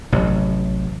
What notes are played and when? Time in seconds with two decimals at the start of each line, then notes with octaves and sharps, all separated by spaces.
0.12 A1 C3 F#3